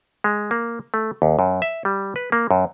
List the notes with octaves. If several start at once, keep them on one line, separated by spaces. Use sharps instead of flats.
G#3
A#3
A3
D#2
F#2
E5
G3
B4
A#3
F#2